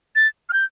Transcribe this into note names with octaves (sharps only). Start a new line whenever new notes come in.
A6
F6
G6